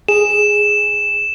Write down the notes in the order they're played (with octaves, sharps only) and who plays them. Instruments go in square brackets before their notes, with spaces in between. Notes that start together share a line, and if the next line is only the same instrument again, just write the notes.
[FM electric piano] G#4 [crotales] E7